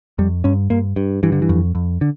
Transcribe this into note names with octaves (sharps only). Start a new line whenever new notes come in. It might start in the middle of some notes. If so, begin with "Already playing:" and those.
F2 G3
G2 C#4
G2 A#3
G2
G2 E3
D3
E3
F2
F2
D3